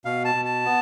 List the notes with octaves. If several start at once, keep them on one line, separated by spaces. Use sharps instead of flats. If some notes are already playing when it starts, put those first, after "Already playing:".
B2 F5
A5
B2
A5
B3